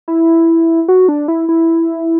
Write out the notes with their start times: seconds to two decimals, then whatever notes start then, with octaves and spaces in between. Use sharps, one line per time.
0.08 E4
0.88 F#4
1.08 D4
1.28 E4
1.49 E4